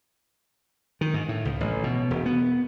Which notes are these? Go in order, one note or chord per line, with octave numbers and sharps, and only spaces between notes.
D#3
G#2
A2
C#2
A1
B2
E1
B3